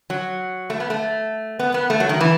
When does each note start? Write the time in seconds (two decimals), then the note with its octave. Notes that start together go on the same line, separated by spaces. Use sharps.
0.10 F#3
0.70 A3
0.80 B3
0.90 A3
1.59 B3
1.74 B3
1.90 A3
2.00 F#3
2.09 D#3
2.21 E3